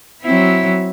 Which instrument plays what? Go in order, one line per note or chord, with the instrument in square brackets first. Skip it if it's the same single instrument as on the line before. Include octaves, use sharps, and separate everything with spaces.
[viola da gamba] F#3 C4 E4